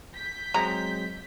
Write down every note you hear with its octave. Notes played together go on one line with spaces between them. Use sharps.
G6 B6
F#3 G#3 C4 A#5